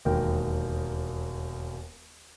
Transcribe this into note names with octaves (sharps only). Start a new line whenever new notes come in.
E1 D#2 A#4 G5